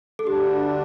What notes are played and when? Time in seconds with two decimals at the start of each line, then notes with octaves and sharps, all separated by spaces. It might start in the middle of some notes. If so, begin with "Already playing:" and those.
0.19 A4
0.27 D2 D3 G3 D4 G4